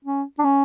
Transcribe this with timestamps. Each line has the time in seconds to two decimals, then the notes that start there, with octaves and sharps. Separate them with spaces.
0.05 C#4
0.39 D4
0.44 C#4